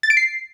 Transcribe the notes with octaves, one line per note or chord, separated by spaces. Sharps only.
A6
D7
C7